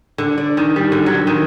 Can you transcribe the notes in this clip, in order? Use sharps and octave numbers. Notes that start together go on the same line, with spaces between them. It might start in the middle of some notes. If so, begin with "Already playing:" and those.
D3
D5
D#3
G3
D3
F#3
D#3